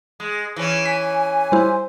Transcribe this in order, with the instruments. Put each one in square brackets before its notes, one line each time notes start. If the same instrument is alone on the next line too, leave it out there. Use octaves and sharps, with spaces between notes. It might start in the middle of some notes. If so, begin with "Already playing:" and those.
[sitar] G#3
E3 C#4
[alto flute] G#5 [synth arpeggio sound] B6
[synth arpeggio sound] G3 E4 [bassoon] C5